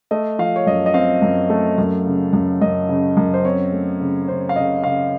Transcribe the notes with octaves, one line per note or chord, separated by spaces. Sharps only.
A3 D#5
F3 F5
C#5
F#2 D#5
D#5
C4 F5
F#2
A3
F#2
C#3
F#2
F#2 D#5
C#3
F#2
C5
C4 C#5
A3
C#3
C#3 C5
F5
C#3 D#5
C#3 F5